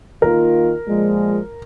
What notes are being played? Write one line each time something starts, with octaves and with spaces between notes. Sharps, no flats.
D#3 A#3 F4 A#4
A#2 F3 G#3